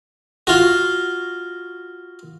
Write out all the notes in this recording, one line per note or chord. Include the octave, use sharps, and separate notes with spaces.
F4 F#4